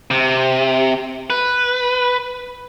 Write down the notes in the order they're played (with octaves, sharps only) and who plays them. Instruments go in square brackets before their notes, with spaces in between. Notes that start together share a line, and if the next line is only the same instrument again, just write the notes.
[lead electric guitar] C3
B4